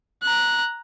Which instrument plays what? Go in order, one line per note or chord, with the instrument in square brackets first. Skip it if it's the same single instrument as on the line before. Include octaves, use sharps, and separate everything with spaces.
[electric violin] A#5 F#6